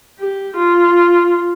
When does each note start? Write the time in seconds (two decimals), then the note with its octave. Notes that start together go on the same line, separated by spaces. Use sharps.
0.19 G4
0.57 F4